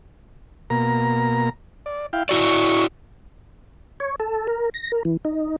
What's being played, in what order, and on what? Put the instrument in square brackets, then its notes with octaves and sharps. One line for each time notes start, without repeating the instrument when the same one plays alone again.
[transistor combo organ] B2 A#3 A#5
D5
E4 F5 G5
[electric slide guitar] E4 F#4 D5 [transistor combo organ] C#6
[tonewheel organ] C#5
A4
A#4
A#6
A#4
E3
D#4